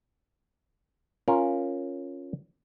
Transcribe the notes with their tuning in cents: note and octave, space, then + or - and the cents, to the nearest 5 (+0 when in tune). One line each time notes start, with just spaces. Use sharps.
C#4 -10 F4 +0 A#4 +0